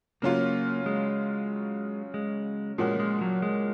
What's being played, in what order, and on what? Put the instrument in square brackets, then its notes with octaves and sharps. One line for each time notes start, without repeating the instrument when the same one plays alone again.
[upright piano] C#3 F#3 C#4 F4 [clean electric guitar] A#3
[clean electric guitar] G#3
G#3
[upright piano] A#2 F3 A#3 C#4 F#4 [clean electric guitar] G#3
[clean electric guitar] G#3
F#3
G#3